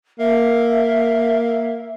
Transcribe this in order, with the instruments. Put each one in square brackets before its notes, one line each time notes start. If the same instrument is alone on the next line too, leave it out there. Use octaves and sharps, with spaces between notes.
[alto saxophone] A#3 [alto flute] E5